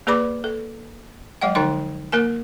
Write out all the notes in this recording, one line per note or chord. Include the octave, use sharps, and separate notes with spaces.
A#3 G#4 B4 D5 B5 D6
A4
F#3 G#3 D#5 F#5 G5
D3 F3 D#4 G5 C6
A#3 A#4 G#5